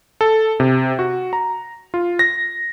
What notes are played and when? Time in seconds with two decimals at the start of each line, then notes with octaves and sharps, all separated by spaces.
0.21 A4
0.60 C3
0.99 F#4
1.33 A#5
1.94 F4
2.19 A#6